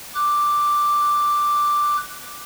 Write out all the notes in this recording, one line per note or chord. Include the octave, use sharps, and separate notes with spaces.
D6 F#6